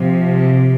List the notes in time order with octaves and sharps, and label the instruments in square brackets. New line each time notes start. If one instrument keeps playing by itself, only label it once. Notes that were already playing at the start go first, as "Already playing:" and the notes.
Already playing: [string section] C3 F3